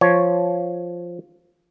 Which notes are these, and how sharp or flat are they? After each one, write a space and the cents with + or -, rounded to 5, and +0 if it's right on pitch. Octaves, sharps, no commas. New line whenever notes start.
F3 +0 C#5 +0